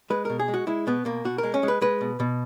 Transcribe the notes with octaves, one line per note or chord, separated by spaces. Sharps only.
G#3 B4
B2 A#4
G#4
G#3
F#4
G#3 E4
B2 B3
B2 A#3
B2 F#4
A#4
G#3
C#4
G#3
B4
G#3 B4
B2
B2